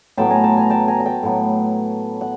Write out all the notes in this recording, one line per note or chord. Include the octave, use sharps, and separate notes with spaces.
A2 F#3 B3 G5 A5
G#5 A#5
G5 A5
G#5 A#5
G5 A5
G#5 A#5
A#5
G5 A5
A2 F#3 B3
F#5